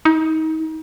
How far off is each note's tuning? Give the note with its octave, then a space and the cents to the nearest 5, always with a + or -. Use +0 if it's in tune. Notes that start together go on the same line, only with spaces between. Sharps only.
D#4 +30